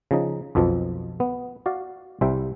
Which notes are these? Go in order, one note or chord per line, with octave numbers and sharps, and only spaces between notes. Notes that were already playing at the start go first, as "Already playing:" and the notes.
C#3 F3 D#4
B1 F2 B2 F3
B3
F#4 D5 F5
C2 G3 C5 E5 G5